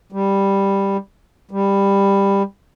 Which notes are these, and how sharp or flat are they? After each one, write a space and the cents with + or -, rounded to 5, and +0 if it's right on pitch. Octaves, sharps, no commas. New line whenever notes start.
G3 +5
G3 +15